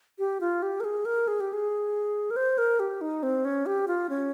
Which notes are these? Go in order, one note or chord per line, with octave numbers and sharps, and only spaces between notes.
G4
F4
G4
A#4
G#4
A#4
G#4
G4
G#4
A#4
C5
A#4
G4
D#4
C4
C#4
G4
F4
C#4